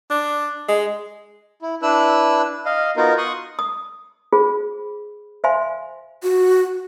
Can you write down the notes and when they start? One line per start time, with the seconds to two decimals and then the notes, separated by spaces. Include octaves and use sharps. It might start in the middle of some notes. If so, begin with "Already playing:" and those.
0.10 D4
0.68 G#3
1.62 E4
1.82 D4 E4 B4 E6 F#6
2.66 D#5 F5
2.97 B3 D#4 F4 F#4 A#4
3.18 C6 C#6 D#6 F#6
3.59 D#6
4.32 F4 G#4 C5
5.44 C5 E5 F5 G#5 C6
6.23 F#4